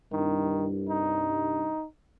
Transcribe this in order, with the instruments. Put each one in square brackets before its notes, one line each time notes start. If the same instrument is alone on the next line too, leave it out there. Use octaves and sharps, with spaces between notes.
[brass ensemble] C2 G2 [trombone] D#3
[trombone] D#4